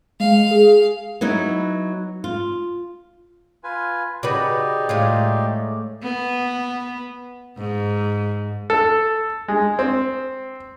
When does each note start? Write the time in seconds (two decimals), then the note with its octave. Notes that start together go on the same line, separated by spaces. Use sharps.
0.20 G#3 F5
0.51 G#4
1.21 F#3 B3 D#4 E4
2.24 F4
3.64 F4 B4 G#5
4.23 C#3 D#4 F#4 G4 B4 D5
4.89 A2 G#3 F4
6.03 B3
7.57 G#2
8.70 A4
9.48 G#3
9.79 C4